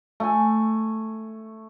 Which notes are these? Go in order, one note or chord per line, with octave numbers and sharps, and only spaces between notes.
A3 G#5